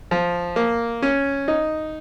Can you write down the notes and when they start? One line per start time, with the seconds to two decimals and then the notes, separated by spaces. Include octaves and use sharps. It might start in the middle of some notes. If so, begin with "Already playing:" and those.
0.11 F3
0.56 A#3
1.02 C#4
1.48 D#4